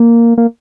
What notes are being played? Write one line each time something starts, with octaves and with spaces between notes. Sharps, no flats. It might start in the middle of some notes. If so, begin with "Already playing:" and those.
Already playing: A#3
A#3